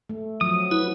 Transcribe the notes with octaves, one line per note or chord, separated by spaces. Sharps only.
A3
F3 F#3 D#6
E4 B4